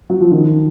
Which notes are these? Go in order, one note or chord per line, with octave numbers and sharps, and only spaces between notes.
F#3
F3
D#3